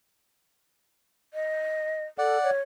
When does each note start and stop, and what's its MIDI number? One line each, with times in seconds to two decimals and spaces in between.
1.34 2.05 75
2.18 2.38 69
2.18 2.50 74
2.18 2.50 78
2.43 2.61 73